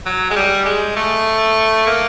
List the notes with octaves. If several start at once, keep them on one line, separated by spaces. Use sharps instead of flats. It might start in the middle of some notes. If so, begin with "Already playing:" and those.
F#3
G#3
G3
G#3
A3
A#3